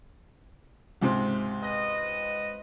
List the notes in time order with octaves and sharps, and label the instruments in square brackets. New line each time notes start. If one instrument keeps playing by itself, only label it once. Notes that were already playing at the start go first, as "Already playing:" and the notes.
[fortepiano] C#2 G#2 C3
[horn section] B4 D#5